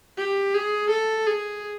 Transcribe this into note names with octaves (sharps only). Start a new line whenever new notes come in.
G4
G#4
A4
G#4